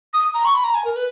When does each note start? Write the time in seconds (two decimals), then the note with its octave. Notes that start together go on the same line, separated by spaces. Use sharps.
0.14 D#6
0.34 A#5
0.45 C#6
0.54 B5
0.64 A#5
0.75 G#5
0.85 A#4
0.96 B4